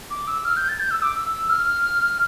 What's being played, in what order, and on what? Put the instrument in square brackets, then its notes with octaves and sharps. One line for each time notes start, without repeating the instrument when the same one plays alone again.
[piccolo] D6
E6
F6
G6
A6
G6
E6
D6
E6
F6